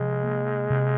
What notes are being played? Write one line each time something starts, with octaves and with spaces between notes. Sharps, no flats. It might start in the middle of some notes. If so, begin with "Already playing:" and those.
Already playing: C3 F3 G#3
A#3
C3